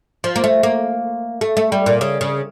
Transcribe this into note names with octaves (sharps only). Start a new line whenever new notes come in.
F3
A#3
A3
A#3
A3
A3
G3
A#2
C#3
C#3